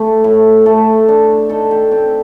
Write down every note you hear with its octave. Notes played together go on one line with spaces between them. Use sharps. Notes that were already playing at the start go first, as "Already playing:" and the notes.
Already playing: A3 G4
A2
A3 A4
D4
D#4 A4
G4
C4 G4